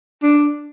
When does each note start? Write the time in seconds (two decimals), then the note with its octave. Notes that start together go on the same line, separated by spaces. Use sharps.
0.23 D4